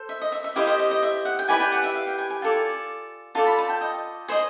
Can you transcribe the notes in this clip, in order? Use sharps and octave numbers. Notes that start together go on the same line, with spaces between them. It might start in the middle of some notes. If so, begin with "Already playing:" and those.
Already playing: A4 C5
E5
D#5
E5
E5
E4 G4 C5 D#5 F5
D#5
D#5
D#5
E5
F#5
G5
E4 G4 B4 D5 G#5
G5
F#5
E5
F5
G5
G#5
G#5
F4 A4 D5
F4 A4 D5 A5
B5
A5
G5
D#5
G#4 C5 D#5